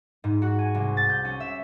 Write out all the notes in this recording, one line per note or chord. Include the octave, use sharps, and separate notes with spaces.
G#2
F#4
G#5
C2
A6
G6
C#4
E5